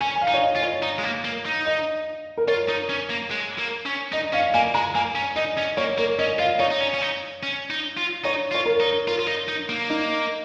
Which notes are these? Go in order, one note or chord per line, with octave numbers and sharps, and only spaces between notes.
C#4 G#5
G#5
F5
D#4
C#5
D#5
F4
C#5
D#4
G#3
A#3
A#3
D#4
D#5
A#4
F4 C#5
D#4
C#4
A#3
G#3
A#3
C#4
D#4 D#5
C#4 F5
A#3 G#5
G#3 A#5
A#3 G#5
C#4
D#4 D#5
C#4
A#3 C#5
A#3 A#4
C#4 D#5
F4 F5
D#4 C#5
D#4
C#4
C#4
D#4
C#4
D#4
F4
D#4 C#5
F4 C#5
A#4
D#4
F4 A#4
F4
D#4
D#4
A#3
D#4